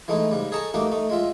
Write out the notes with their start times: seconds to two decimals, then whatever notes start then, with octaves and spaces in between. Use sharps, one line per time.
0.08 E3 G#3 A3 D#4
0.31 G#2 C#3 G3
0.52 G#4 A4 C#5 D#5 A5 A#5
0.74 A3 A#3 D#4 F#4 G4
0.92 A3 D#4
1.10 G#3 F4 E5